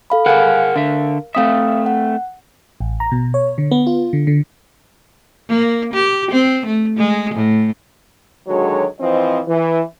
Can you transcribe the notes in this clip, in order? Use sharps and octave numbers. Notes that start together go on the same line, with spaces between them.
A4 F5 B5
G#4 A#4 F5 F#5 G#5 F#6
D3 A#4 E5 F5
A3 C4 E5 F5 D#6
F#5
A1
A#5
B2
C#5
D3
B3
F4
D3
D3
A#3
G4
C4
A3
G#3
A2
D3 D#3 F#3 G#3 F#4 C#5
E3 F3 C4 D#5
E3